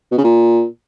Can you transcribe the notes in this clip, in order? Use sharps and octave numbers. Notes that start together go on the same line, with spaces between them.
B2
C#3
A#2